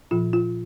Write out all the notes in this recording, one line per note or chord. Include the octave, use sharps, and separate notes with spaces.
A#2 F3 F4
F4